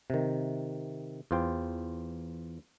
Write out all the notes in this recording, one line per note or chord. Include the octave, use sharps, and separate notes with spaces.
C3 D#3
E2 F4 C5 G5